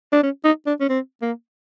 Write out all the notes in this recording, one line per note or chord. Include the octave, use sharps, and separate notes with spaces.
D4
C#4
D#4
D4
C#4
C4
A#3